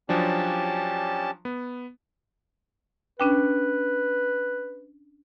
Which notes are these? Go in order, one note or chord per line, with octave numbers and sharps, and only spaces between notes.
F3 F#3 C#4 D4 G4 A5
B3
C#4 D4 B4 G5